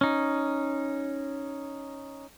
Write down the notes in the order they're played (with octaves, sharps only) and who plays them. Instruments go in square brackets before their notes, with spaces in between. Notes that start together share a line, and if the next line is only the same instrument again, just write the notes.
[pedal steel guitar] C#4 D#4